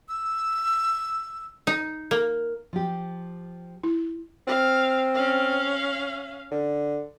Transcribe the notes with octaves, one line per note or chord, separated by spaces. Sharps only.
E6
D#4
A#3
F3 G4
E4
C4 F5
C#4 F5
D3